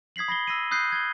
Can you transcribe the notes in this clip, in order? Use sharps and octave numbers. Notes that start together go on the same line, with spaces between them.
D#6 G#6 B6 C7 F#7
B5 A#6 C7 G7
E6 A#6 C7 D#7
B5 D#6 F#6 G6 C7
G#6 G7